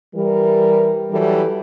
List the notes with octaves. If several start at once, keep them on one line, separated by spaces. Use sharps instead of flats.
E3 G3 A#4
E3 F#3 G3 E4 G4 A4